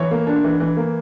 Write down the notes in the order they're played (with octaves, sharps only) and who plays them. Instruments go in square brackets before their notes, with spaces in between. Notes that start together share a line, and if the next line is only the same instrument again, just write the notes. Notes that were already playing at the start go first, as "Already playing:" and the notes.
Already playing: [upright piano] E3 C#5
A#3
D4
E3
E3
A#3